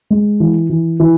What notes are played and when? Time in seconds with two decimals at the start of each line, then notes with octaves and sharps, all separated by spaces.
0.10 G#3
0.40 E3
0.70 E3
1.00 E3